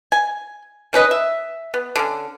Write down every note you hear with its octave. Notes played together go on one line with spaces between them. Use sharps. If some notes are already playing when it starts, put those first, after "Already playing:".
G#5
D#3 C#4 B4 D#5
E5
B3
D3 C#4